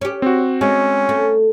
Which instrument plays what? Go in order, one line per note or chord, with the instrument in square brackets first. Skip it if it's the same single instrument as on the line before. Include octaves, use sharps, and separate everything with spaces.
[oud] C#4 G4
[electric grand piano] C4 F#4
[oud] G#3 [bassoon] C#4
[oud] A3